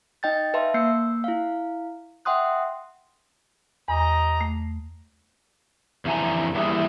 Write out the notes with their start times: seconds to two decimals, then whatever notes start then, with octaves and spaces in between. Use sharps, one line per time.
0.23 D#4 D#5 G5 G6 A6
0.54 B4 E5 F5 A5 C6
0.74 A#3 E6 G6 C7 C#7
1.24 E4 F5
2.25 E5 F#5 G5 C6 D#6 F#6
3.88 E2 G4 D#5 A#5
4.41 A3
6.05 F2 D3 E3 F#5 G#5 A#5
6.55 E3 G3 A#3 E4 G#4